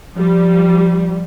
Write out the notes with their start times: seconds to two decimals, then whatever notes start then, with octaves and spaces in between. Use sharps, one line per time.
0.16 F3 G3